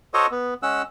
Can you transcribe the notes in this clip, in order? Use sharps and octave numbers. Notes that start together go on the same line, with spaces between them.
F#4 A4 C5 C#5 D#5
B3
G#3 C#4 F#5 E6